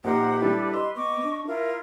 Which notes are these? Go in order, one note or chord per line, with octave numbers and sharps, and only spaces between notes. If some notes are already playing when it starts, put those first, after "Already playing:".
A#1 D#4 G4 A#4 C5 F#5
G3 D4 E4 A4 B4 D5
B4 D#5 C6 E6
B3 D#5 C#6 D6
D4
E4 F4 A#4 E5